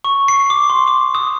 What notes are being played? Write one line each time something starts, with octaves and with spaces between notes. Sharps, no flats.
C#6
C7
D6
C6
D6
D#6